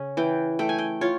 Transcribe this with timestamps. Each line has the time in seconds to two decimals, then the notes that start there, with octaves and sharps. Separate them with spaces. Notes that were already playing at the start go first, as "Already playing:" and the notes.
Already playing: C#3 C#4
0.17 E3 G5
0.59 A3 G5
0.69 G#5
0.79 G5
1.01 F4 C#5